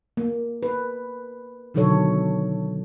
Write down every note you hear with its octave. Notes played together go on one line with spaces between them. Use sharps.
A#3
B4
B2 D3 D#3 F#3 A4 C#5